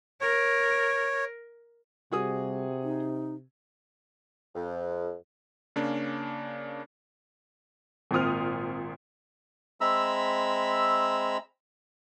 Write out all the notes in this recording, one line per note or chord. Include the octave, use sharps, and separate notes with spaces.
A#4 C#5
C3 G3 F#4 G#4 D#6
D#4
F2
C#3 A#3 C#4 D4
G#1 A#2 C4 D#6 F6
G#3 C4 E5 A#5 B5 E6